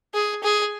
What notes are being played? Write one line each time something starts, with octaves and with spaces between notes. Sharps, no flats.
G#4
G#4